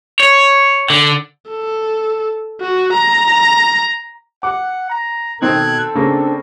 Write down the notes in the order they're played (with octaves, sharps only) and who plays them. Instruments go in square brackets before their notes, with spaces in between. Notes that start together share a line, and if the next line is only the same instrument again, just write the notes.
[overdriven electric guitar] C#5
D3
[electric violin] A4
F#4
A#5
[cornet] F#5 [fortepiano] D6
[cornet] A#5
[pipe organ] B2 F#6 G#6 [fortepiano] D#3 C4 D#4 [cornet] A4
[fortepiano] C#3 A#3 [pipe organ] C4 D4